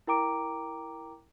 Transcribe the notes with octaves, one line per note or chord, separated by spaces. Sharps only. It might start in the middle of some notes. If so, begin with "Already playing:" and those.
E4 A#4 G5 A#5 D6 D7